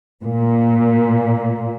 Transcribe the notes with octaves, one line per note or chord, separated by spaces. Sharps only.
A#2